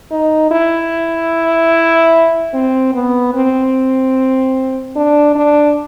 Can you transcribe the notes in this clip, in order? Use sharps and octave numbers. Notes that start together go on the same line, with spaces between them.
D#4
E4
C4
B3
C4
D4
D4